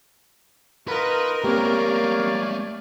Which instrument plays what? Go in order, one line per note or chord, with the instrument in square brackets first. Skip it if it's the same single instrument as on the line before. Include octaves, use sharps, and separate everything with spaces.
[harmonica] B3 D#4 F4 [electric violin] A#4 [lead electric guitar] B4 B5
[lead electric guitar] A3 A#3 [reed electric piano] C4 G4 [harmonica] C#5 D5 F5